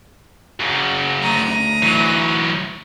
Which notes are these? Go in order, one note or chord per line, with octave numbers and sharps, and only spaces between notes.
F#2 C#3
D2 A#5 D#6
E3 F#3